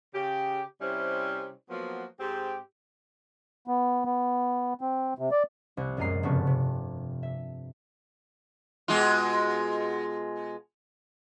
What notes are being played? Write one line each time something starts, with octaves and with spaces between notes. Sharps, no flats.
C#3 G4
C3 G3 C#4 E4 C5
F3 F#3 A#3 B3 F#4
G#2 C4 G4
B3
B3
C4
C3
D5
C2 F#6
A#1 F#2 G#3 D#5 A#5 C7
F1 G2 C#3 B3 F#4 A5
C3
E5
B2 G#3 F4